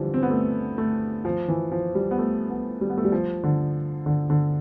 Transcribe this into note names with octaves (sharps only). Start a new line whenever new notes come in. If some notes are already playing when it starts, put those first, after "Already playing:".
Already playing: D3 E3 F3 G3
C4
B3
A3
A3
F3
E3
F3
G3
B3
A3
B3
G3
B3
A3
G3
F3
D3
D3
D3